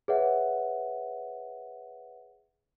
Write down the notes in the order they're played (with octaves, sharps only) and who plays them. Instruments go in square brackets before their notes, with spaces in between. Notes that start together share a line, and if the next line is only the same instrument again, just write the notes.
[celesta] G#4 B4 C#5 E5 F#5